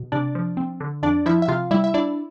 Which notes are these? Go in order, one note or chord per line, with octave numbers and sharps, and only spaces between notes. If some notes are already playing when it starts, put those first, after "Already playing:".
Already playing: B2
C3 D4 D5
F3
C4
D3
F2 D4 D5
F3 E4 E5
E5
C3 F4 F5
G3 E4 E5
E5
D4 E4 D5